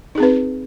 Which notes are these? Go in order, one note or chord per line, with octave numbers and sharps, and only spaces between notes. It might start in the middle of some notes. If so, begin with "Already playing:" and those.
C4 D#4 G#4 B4